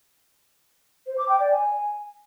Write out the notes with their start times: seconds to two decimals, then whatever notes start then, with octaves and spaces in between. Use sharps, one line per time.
1.07 C5
1.18 D6
1.29 G5
1.40 D5
1.51 G#5